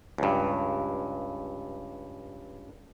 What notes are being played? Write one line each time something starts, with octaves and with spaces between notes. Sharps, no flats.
C#2 G2